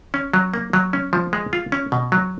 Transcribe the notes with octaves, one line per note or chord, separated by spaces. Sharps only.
C#4
F#3
A#3
F#3
C#4
F3
G#3
F4
C#4
B2
F#3